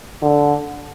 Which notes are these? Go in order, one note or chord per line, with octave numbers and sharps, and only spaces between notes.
D3